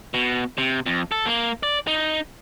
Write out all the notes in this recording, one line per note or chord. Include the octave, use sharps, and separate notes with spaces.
B2
C3
F2
A4
A#3
D5
D#4